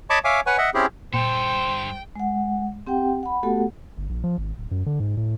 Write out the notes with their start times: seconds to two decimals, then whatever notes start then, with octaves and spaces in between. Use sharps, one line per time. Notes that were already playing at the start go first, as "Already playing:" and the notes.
0.10 C#5 D#5 A5 B5 C#6 D6
0.24 C#5 E5 F5 G#5 D6
0.46 B4 C#5 F#5 G#5 C#6
0.58 D#5 E5 F#5
0.74 C4 C#4 E4 G4 G#4
1.14 G2 A#2 A4 C5 G5
2.16 G#3 F#5
2.87 C4 G4 F#5 G5
3.23 F#5 B5
3.43 A3 B3 F#4 G4 A4 F#5
3.97 G1
4.09 A#1
4.24 F3
4.38 G#1
4.58 D1
4.71 F#2
4.86 D3
5.00 G#2
5.17 A2